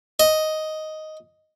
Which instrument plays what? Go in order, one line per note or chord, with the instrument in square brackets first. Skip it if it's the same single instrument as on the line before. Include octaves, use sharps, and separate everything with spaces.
[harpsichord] D#5